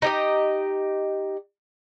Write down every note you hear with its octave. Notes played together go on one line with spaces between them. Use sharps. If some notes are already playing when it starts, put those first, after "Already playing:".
D#4 G4 D#5